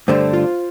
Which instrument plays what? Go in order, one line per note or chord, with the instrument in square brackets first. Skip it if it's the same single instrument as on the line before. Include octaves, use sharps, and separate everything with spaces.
[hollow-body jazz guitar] G2 D3 A3 D4 [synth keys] C5
[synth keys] F4